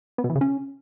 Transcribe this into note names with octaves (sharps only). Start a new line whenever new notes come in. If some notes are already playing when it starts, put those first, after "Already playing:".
B3
B2
E3
C#3
C#4